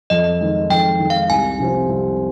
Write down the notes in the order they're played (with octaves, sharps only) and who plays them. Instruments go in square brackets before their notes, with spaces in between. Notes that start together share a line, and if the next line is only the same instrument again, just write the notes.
[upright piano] F2 [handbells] D#5
[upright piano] D#3 G#3
[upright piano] F2 [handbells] G5
[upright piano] D#3 G#3
[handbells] F5
[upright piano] C2 [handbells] G#5
[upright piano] C3 F3 C4 F4
C2